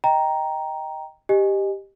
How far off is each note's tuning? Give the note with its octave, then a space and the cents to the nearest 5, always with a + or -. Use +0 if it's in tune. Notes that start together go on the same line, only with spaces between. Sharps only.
D#5 +10 G5 +0 A#5 +5
G4 +0 D#5 -15 G#5 -5